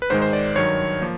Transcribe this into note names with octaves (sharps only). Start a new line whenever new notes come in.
B4
G#2 D#3 G#3 C5
C5
D5
G2 D#3 F#3 C#5
F3 A#3